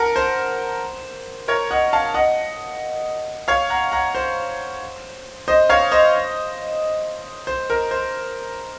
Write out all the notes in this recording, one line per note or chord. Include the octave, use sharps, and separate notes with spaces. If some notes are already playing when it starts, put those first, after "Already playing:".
Already playing: A#4 F#5 A5
C5
A#4 C#5
D#5 F#5
F5 A5
D#5 F#5
C#5 F5
F#5 A#5
F#5 A#5
C5
C5 D#5
C#5 F5
C5 D#5
C5
A#4
C5